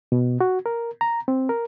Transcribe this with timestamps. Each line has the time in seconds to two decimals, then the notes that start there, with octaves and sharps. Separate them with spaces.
0.12 B2
0.41 F#4
0.66 A#4
1.01 A#5
1.28 C4
1.49 A#4